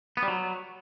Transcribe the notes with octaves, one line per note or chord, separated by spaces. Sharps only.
B3
G3
F#3